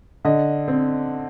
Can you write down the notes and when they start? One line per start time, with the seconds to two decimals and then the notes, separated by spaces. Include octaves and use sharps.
0.25 D3 D#5
0.68 C4